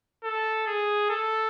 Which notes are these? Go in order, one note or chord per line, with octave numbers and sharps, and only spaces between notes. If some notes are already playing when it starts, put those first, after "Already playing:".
A4
G#4
A4